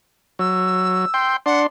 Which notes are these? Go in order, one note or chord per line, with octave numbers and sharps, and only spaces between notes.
F#3 E6
G5 C6
D4 F#5 C6